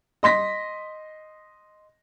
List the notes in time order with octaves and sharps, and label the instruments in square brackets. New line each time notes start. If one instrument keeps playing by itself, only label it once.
[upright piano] D#5 C6 A#6 B6